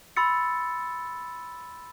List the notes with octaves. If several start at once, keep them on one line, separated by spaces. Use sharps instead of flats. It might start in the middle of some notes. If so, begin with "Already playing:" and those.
B5 C6 E6 A6 C#7